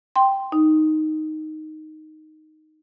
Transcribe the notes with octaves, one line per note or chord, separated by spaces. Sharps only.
G5 C6
D#4